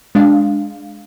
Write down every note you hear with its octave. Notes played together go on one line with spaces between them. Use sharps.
G#3 D4 F5